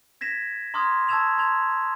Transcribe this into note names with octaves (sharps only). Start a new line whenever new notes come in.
G#6 A#6 B6 E7
A#5 C6 D6 D#6 F6 G#6
A5 C#6 E6 G#6 E7 F7
A5 A#5 C6 G#6 F7